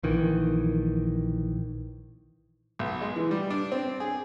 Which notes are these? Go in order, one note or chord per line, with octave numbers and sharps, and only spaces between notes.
A#1 D#3 E3
B1
G#3
E3
G3
D4
C4
G#4